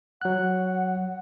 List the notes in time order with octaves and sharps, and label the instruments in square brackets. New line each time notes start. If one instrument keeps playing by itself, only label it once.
[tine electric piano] F#3 F#6 [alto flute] F#5